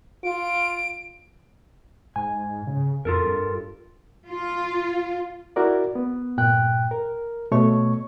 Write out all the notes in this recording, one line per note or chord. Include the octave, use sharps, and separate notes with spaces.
F4 D7
G#2 G#5
C#3
F2 F4 A4 A#4
G2
F4
E4 F#4 A#4 D5
B3
G2 A#2 G5 F#6
A#4
B2 A3 C#5 C#6